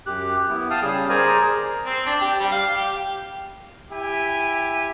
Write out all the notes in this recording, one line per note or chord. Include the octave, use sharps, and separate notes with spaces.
F#2 G4 F#6
B3 E4
F5 G5 A5 D#6 F6
C#3 G3 G#4
G#4 A#4 C5 D5 G#5 A#5
C4
D4
G4
G3
F5
G4
E4 G4 G#5